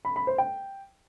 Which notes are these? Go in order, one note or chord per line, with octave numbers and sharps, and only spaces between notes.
B5
B5
C5
G5